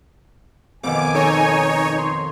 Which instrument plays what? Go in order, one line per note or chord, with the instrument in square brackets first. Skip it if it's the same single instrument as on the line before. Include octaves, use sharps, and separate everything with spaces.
[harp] F2 B2 D#3 [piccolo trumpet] G#5 [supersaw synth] D6
[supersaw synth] D#4 C#5 [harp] A4
[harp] C6